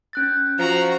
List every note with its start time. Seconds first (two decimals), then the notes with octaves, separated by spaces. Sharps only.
0.13 C#4 F#6 A6
0.59 F3 F#4 A#5